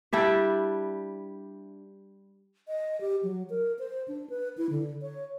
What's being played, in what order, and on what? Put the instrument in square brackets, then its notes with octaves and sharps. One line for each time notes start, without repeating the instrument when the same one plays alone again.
[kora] G3 D4 E4 G4
[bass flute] D#5
G4
F#3
A#4
C5
D4
B4
E4
D3
C#5